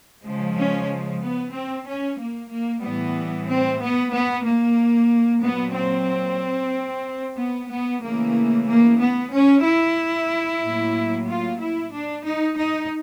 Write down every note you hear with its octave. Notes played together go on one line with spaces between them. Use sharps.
C#3 F3 G#3
C#4
B3
C4
C#4
A#3
A#3
A2 E3 G3 B3
C4
B3
B3
A#3
A#2 F#3 A#3 B3
C4
B3
B3
C#3 E3 A3 A#3
A#3
B3
C#4
E4
A2 F#3 A#3
F4
E4
D4
D#4
D#4